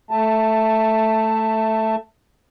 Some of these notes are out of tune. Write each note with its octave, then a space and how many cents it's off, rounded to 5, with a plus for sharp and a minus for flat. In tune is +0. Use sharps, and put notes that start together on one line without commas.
A3 +0 E5 +0 A5 +15